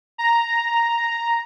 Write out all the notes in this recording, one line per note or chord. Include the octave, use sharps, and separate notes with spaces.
A#5